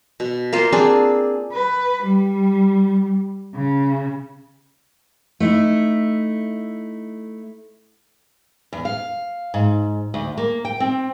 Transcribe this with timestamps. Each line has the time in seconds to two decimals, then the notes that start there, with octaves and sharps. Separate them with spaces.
0.20 B2
0.53 A#3 F4 C5
0.72 C4 D4 G#4
1.52 B4
2.03 G3
3.55 C#3
5.40 A3 D#4 E4
8.73 E2
8.85 F5
9.54 G#2
10.14 D2
10.38 A#3
10.65 G5
10.80 C4